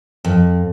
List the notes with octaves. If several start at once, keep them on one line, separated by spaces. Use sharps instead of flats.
F2